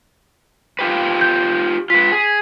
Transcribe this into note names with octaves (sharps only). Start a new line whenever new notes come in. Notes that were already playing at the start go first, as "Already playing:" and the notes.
F4 G4 B4
G6
F4 B4 B6
G#4